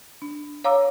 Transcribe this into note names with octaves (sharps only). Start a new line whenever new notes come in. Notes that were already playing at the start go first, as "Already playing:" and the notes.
D4
C#5 F5 A#5 D6 E6